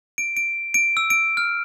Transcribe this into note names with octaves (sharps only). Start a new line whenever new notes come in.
D7
D7
D7
E6
D7
F6